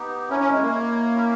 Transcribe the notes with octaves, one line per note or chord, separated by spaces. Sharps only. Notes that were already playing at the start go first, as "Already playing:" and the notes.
Already playing: B3 D#4 G4
C#4 E4 A#4 C#5
C#4
G#3
A#3
E4 A#4 C#5
C#4 E4 A#4 E5